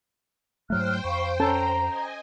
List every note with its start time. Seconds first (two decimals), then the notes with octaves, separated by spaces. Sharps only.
0.70 G#2 F#3 A3 C5 G5 F6 F#6
1.05 F2 F5 B5 C#6
1.40 C#4 A4 A5 A#5
1.84 D#5 G#5